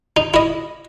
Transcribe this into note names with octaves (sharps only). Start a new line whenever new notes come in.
D#4
E4 D#5